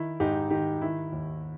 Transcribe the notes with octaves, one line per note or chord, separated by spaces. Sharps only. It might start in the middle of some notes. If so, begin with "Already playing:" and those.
Already playing: D#3 E4
G#2 D#4 G4
D#3 D#4 G4
D#3 E4
D#2